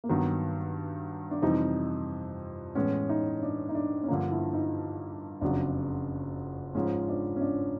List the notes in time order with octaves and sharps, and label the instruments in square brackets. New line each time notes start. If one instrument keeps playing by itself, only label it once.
[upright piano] A#3
[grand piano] G2 D#3 F#3 [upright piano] B3
[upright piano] D4
[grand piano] F2 C3 E3 G3 C4 [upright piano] D#4
[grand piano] A2 E3 G#3 B3 [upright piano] C#4
[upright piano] D#4
D4
D#4
D4
C#4
[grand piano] G2 D3 F3 A#3 [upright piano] D4
[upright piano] E4
D#4
[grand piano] F#1 F2 C#3 F#3 [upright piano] D4
[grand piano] G#2 F3 G#3 [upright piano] C#4
[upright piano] D4
C#4
D4